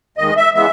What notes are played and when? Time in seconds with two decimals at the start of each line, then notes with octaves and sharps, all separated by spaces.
0.18 D#2 D#3 G#3 D#5
0.36 E5
0.54 C#3 E3 G#3 B3 E5